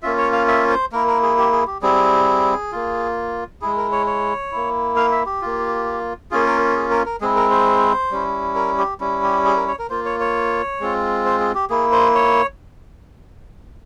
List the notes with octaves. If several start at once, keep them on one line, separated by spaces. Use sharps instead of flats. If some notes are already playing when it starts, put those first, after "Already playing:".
A#3 C#4 F4 E5
C#5
F5
E5
C5
A#3 E4 A#4
A#4
G#4
G4
G#4
G4
G3 C4 E4 G#4
A#3 F4
G#3 E4 G#4
A#4
C#5
C#5
A#3 E4
F5
E5
G4
A#3 F4
A#3 C#4 F4 G#4
A#4
G#4
A#4
A#4
G#3 C4 E4 G#4
A#4
C5
G3 C#4 E4
A#4
G4
G3 C#4 E4
G4
G#4
A#4
C#5
A#4
A#3 F4 C5
C#5
C#5
G#3 C4 F4
C5
G#4
G4
A#3 E4 G#4
C5
C#5